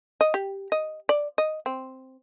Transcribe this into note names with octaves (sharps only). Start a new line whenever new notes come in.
D#5
G4
D#5
D5
D#5
C4